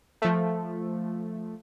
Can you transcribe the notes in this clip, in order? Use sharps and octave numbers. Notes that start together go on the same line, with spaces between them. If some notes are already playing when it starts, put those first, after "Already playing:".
F3 A3